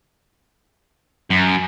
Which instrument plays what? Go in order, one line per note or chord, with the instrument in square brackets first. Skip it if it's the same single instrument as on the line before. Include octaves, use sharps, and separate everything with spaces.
[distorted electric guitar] F#2